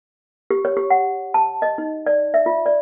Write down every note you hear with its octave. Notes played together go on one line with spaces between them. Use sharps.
G4
C#5
G4
F#5
A5
D#5
D#4
D5
E5
F4
D5